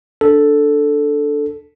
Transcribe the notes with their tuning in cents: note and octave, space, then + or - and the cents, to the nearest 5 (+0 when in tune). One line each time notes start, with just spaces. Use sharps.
D4 +0 A4 +0